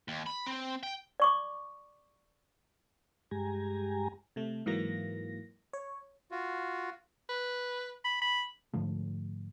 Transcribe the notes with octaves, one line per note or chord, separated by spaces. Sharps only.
D#2
B5
C4
G5
D5 C#6 D6
G2 G#3 G4 G#5 A#5
C3 A3
G#2 E3 F#3 A#3 A#6
C#5
F4 F#4
B4
B5
B5
G#2 D3 F3 A3